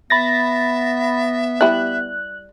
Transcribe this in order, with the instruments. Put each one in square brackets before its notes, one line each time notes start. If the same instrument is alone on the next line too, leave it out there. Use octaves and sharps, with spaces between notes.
[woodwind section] B3 [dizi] E5 [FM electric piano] B5 A6 A#6
[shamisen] G3 E4 [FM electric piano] F#6